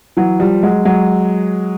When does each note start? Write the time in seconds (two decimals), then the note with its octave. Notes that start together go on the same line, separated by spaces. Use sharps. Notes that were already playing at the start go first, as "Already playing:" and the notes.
0.17 E3 F#3
0.40 F3 G3
0.63 F#3 G#3
0.85 F#3 G#3